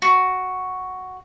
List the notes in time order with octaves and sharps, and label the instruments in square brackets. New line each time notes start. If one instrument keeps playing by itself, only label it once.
[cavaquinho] F#4